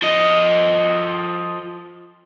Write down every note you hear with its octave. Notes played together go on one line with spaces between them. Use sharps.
F3 D#5